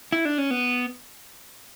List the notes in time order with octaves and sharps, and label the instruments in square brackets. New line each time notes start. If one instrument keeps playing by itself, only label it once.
[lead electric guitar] E4
D4
C#4
B3